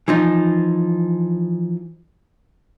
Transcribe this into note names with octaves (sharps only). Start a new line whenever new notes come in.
E3 F3 D#4